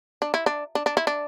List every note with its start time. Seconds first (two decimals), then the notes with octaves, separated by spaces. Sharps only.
0.22 D4
0.34 E4
0.46 D4
0.75 D4
0.86 D4
0.97 E4
1.07 D4